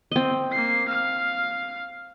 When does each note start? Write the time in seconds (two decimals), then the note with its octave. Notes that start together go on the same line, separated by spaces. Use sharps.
0.11 C4 D#5
0.52 A#3 C7
0.88 F5 F6